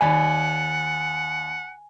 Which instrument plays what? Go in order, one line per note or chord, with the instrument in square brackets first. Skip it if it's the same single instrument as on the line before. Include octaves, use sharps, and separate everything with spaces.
[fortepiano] D#2 D5 B5 [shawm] F#5 [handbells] G#5